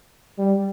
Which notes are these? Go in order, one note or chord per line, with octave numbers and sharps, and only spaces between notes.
G3